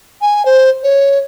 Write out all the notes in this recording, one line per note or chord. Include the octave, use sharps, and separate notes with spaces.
G#5
C5
C#5